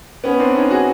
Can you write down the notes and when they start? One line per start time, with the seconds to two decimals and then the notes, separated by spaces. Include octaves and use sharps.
0.24 B3 C#4
0.39 C4 D4
0.55 C#4 D#4
0.70 F#4 G#4